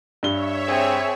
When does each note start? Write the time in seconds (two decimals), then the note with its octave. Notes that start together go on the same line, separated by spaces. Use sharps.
0.23 G2 C#5 E5 G7
0.67 C4 G#4